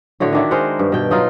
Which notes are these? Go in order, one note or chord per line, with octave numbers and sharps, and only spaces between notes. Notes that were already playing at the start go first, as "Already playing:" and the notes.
A2 D3 F#4 C#5
D#3 D4 E4
G#3 A#4 C5 F#5
G2
B2 G5
F#3 D#4 F4